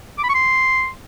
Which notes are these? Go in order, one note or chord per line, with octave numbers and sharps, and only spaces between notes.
D6
B5
C#6
C6